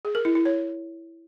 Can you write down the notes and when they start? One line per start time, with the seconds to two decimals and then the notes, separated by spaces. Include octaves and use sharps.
0.05 G#4
0.15 A#4
0.25 E4
0.35 E4
0.45 C#5